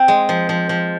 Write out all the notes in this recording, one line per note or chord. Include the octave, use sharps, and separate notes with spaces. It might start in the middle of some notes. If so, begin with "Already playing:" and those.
Already playing: C4
G#3
F3
F3
F3